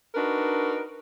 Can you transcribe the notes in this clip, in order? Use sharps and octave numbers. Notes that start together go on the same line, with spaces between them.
D4 D#4 F#4 A#4 B4